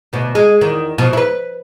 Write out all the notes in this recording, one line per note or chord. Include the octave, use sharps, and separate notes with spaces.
D2 B2
G#3
E2 D#3
B2 F3
E4 B4